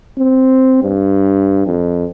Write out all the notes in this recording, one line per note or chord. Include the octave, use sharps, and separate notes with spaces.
C4
G2
F2